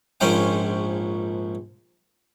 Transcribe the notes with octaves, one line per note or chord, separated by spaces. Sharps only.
A#1 G#2 C#4 C5 G5